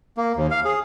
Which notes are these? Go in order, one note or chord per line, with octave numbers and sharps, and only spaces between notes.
A#3
D#2
F5
G#4